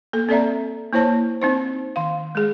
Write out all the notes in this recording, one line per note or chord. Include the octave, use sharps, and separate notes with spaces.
A#3 A4
C4 A4 D5 E5 A#5
A#3 E4 C5 C#5 A5
C4 D#4 C5
D#3 F5
G#3 G#4